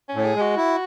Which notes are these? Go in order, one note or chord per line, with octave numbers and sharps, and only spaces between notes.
C#4
A2
G#4
G#3
F#4
E4